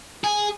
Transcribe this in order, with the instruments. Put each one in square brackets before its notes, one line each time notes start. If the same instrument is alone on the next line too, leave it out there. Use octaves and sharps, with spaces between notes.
[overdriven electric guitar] G#4